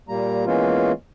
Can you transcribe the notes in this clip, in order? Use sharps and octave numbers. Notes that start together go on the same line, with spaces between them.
A#2 G3 A#3 A#5
E3 G#3 A#3 B3 C#4 F4